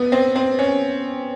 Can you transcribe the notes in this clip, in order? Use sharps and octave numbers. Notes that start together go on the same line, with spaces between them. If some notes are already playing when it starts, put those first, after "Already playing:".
Already playing: B3
C4
C4
C#4